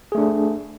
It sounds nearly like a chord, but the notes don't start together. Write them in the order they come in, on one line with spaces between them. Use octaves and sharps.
G#4 A3 D4